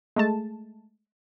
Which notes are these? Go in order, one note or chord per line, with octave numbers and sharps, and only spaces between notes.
G#3 A3 A5